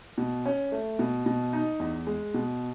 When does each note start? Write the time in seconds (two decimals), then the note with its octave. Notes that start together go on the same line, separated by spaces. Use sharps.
0.18 B2
0.46 C#4
0.72 A3
0.99 B2
1.26 B2
1.53 D#4
1.80 E2
2.07 G#3
2.34 B2